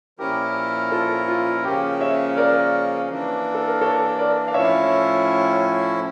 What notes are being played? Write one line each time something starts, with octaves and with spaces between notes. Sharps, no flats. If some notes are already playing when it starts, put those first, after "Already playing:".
A#2 F3 C#4 E4 G4 A#4
F4 A4
F4
C#3 F3 A#3 C#4 G4
C#5 E5
A#4 D5
E3 A#3 D4
A4
A#4
A4 C#5
A#4 D5
F5
A2 F3 C#4 E4 C#5 E5